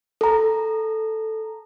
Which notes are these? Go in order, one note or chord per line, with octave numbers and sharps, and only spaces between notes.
A4 A#5